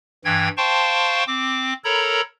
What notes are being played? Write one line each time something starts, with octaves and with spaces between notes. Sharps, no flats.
G2 E3 G5 G#6
C5 F5 G5 A5 C6 C#6
C4 D6
A4 A#4 C#5 A#5 B5